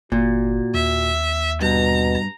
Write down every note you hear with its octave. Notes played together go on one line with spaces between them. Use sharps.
G1 A#2 F#4
D#2 E5
G2 B2 A#5